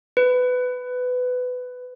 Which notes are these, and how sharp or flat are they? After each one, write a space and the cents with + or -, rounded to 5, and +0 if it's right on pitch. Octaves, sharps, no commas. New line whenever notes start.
B4 +15